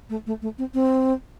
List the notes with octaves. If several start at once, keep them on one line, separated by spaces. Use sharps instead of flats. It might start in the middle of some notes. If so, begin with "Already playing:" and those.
A3
A3
A3
C4
C4